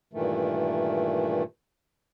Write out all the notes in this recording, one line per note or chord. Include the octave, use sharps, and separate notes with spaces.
G2 A#2 D#3 E3 A3